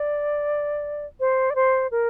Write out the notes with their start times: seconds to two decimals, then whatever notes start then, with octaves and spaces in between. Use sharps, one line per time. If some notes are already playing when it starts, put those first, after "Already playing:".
Already playing: D5
1.20 C5
1.50 D5
1.55 C5
1.91 A#4